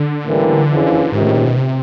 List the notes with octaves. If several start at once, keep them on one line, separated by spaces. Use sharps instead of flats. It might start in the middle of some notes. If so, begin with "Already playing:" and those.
Already playing: D3
A1 A2 E3 G3 A#3
F#1 F2 C#3 E3
C#2 G#2 C3 D#3
A2
A#2
B2
C3